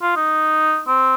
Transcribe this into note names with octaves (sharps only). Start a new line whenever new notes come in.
F4
D#4
C4